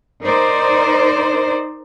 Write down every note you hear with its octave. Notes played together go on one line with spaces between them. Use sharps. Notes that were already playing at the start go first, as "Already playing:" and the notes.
D#4 A#4 C5 D5